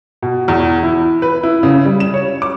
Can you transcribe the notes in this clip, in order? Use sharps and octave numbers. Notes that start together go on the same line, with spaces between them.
B2
E2
E4
B4
E4
C#3
G3
E7
C#5
D6